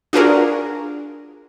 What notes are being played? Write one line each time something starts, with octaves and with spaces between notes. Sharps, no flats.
D4 F4 F#4 G#4 A#4